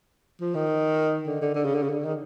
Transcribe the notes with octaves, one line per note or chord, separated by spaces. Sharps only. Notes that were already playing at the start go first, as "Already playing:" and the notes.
F3
D#3
D3
D3
D3
C#3
D3
C#3
D3
D#3